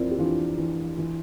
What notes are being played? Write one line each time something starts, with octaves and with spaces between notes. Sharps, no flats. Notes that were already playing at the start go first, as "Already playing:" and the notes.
Already playing: F2 E3 C4 E4 F4 A#4 D5
G4
E3 D4 F4
E3
E3